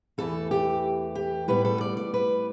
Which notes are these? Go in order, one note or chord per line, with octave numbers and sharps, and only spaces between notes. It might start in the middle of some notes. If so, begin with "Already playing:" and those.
E2 E3 A3 A4
G4
G4
A2 G3 B3 B4
A4
D5
D5
B4